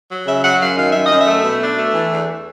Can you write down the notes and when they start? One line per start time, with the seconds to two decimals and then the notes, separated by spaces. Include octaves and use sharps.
0.10 F#3
0.26 C#3 E5
0.43 F#3 F#5
0.60 F#2 F5
0.76 D#3 F5
0.91 F#2 E5
1.05 D#5
1.11 F#2
1.19 E5
1.27 A3
1.44 B2
1.60 D4 E5
1.77 A3
1.94 E3
2.11 E2